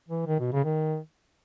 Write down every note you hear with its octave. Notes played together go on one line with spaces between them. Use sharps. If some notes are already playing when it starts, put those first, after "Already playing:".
E3
D#3
B2
C#3
D#3